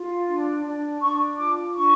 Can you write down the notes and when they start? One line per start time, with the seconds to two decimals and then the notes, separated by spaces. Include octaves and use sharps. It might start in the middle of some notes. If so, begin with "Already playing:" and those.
Already playing: F4
0.28 D4
0.64 D4
1.00 D4 C#6
1.37 F4 D6
1.74 D4 C#6